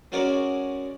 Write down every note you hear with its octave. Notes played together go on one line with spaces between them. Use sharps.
G#3 C#4 F#4 A#4 D5